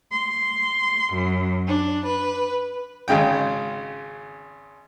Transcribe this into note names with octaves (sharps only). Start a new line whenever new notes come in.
C6
F#2
D4
B4
G#1 C#3 G#3 G5